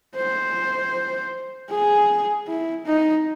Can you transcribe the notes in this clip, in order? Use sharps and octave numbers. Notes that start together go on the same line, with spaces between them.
C5
G#4
E4
D#4